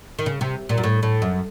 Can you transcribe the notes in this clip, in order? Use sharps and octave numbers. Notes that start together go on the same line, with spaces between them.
D#3
C#3
C3
A#2
F#2
A2
A2
F#2